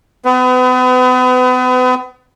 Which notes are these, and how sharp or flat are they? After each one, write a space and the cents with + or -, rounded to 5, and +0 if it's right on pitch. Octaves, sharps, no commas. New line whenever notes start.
B3 +40 B4 +30